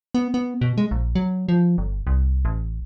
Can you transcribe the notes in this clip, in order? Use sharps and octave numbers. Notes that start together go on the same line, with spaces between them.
B3
B3
B2
G#3
A#1
F#3
F3
G1
C2
A1